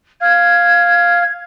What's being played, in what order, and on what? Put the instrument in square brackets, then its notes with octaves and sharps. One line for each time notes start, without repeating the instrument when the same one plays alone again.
[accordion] F5 [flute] G#6